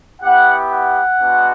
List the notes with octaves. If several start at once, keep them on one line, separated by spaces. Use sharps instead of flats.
B3 E4 G4 F#5
F#5
G#3 B3 D4 F#4